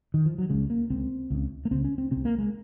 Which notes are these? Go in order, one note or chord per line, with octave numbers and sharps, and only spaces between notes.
D#3
F3
F#3
C#2 C#3 G#3
A#3
C#2 C#3 C4
C#2 C#3
A#3
C#2 C#3 C4
C#4
C4
C2 C3 C4
A#3
G#3